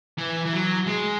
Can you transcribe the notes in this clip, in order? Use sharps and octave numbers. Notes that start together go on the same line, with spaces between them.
E3
E3
F#3
G#3